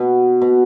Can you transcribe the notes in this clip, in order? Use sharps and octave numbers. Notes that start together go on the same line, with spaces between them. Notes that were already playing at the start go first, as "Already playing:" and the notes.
Already playing: B2
B2